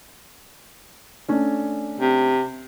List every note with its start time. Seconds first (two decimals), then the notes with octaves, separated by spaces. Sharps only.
1.29 A3 C#4 D4
2.00 C3